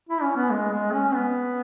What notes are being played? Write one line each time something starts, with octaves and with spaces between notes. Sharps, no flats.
E4
C#4
B3
G#3
G#3
C#4
B3